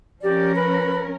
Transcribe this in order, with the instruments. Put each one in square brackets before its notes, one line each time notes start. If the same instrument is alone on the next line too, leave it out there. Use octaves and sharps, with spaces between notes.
[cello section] F3 C#4 A#4 [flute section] G4 D5
[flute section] B4 B5